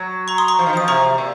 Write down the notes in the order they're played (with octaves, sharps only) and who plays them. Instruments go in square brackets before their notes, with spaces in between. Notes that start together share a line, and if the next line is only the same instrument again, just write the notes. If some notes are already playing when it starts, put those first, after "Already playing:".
Already playing: [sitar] F#3
[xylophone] A#5 C#6
C6 D#6
A#5 C#6
[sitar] F3
D#3
[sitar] F3 [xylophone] D#6
[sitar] C3 [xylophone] A#5 C#6
[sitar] A#2